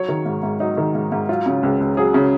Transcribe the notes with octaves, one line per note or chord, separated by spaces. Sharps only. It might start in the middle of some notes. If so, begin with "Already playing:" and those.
Already playing: F#3 C#5
D#3
G#2
G#2
F#3 D#4
D#3
G#2
G#2
F#3 F4
C#3
C#2
C#2
F#3 G#4
C#3